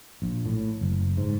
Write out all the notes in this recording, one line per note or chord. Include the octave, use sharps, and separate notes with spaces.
A#1
A2
F#1
G#2